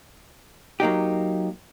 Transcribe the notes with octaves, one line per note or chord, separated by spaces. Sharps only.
F#3 A#3 D#4 G4